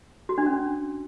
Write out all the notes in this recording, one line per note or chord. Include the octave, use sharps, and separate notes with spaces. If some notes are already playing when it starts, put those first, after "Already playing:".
F#4
D4
C#4